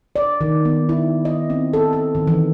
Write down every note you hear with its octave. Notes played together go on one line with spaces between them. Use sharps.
D5
D#3
B3
E4
D#5
C4
A4
A4
D#3
E3